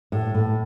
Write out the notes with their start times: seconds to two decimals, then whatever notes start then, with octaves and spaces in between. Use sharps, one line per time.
0.12 A2
0.34 A2